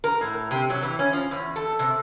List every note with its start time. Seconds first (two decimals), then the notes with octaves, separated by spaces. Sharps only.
0.04 A#4
0.21 A2
0.51 C3
0.70 F#3
0.83 E3
0.99 C#4
1.13 F3
1.31 E2
1.56 A4
1.79 C3